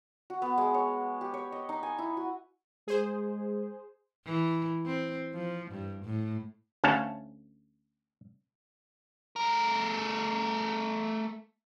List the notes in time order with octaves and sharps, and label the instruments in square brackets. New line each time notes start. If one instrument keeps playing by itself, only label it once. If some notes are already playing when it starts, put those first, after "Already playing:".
[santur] F#4
B3
G#3
C#5
G4
C#5
D#5
D#4
G#5
E4
F#4
[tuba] G#3 [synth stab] G#4 C5
[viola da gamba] E3
C4
F3
G2
A2
[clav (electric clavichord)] D2 C#4 F5 A5
[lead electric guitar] A3 A#4